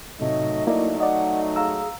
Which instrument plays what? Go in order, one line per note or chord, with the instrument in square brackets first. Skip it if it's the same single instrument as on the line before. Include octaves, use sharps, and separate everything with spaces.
[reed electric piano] A2 C3 [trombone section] F#3 A3 D#4 [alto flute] D#5
[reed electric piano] A#3 E4 D5 [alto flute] D#5
[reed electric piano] D5 D#5 [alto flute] F#5
[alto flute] G#4 [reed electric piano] F5 A#5 E6